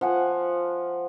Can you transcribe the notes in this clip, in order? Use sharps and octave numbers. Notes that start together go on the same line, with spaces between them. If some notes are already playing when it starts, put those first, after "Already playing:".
F3 F#5 G#5